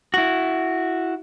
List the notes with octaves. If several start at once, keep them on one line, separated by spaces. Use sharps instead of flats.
E4 F#4